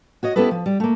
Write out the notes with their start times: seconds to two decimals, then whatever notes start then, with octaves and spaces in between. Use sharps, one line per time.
0.23 F#4 C#5 D#5
0.36 B3 C#4 E4 G4 A4 B4
0.51 F3
0.66 G3
0.80 A3 A#3